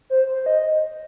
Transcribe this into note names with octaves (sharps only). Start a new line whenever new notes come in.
C5
C5
D#5